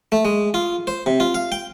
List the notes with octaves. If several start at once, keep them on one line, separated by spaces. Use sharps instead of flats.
A3
G#3
F4
C5
C3
F4
F5
G5